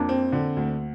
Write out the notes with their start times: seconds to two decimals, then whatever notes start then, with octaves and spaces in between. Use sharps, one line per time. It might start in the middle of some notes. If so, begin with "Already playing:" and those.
Already playing: F2 A#3 D4
0.09 C4
0.32 D3
0.57 D2